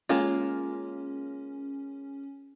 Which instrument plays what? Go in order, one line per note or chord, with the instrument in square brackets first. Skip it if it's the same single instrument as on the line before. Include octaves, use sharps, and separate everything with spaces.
[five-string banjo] G#3 A#3 F4 [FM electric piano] C#4